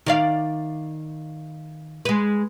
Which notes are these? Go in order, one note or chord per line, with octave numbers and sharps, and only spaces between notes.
D#3 D5 F5
G#3 B4